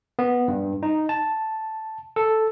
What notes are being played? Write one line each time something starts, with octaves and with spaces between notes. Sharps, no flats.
B3
G2
D#4
A5
A4